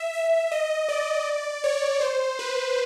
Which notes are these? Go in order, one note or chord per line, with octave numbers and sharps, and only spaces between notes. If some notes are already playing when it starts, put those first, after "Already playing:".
Already playing: E5
E5
D#5
D5
C#5
C5
B4